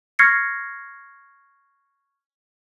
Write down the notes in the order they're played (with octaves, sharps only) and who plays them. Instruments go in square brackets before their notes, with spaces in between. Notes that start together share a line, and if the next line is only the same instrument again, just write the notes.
[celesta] C#6 F6 G#6 A#6 C7 C#7